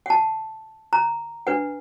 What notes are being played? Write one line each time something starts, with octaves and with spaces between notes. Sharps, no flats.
F#5 A5
A#5
D4 B4 F#5